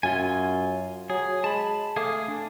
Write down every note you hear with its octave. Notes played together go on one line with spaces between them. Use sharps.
F#2 F4 G#5
F#3 G#4
G#3 A5 B5
A3 G#4 F5 D6
D4